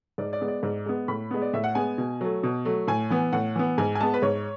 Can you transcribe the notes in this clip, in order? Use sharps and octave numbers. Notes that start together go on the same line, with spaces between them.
G#2 D5
D5
G#3 B3
D5
G#2 D5
G#3 B3
A2 B5
G#3 B3
D5
A2 E5
F#5
G#3 B3 G#5
B2
F#3 A3
B2
F#3 A3
A2 G#5
E3 B3
A2 F#5
E3 B3
G#2 G#5
G#5
G#3 B3 A5
B4
G#2 C#5